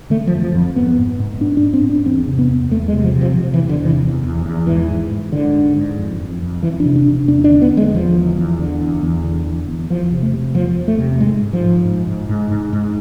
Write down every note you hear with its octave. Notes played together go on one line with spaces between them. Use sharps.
D3 A3
F3
F2
F3
F2
G#2 B3
G#2
G#2
G#2 D4
D4
G#2
C4
G#2
D4
E2 C4
C3
B3
E2
E2 A3
G#3
C3
F3
C3
F3
C3
E3
E2
D3
C3
E3
E2
E2
E2
G#2 E3
G#2
G#2
G#2 D3
G#2
G#2
F2
F2
F2
F2 E3
D4
C3
D4
C3
E2 D4
D4
D3
B3
E2
G#3
D3 F3
E2
E2
D3
E2
E2
D3
E2
E2
E2 F3
C3
A3
C3
E2 F3
E2
A3
C3
G#2 G#3
G#2
F3
G#2
G#2
G#2
G#2
G#2
G#2